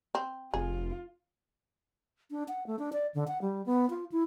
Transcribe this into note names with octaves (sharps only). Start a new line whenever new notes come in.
C4
F1 F4 G#4
D4
F#5
A3
D4
D5
D3
F#5
G3
B3
F4
E4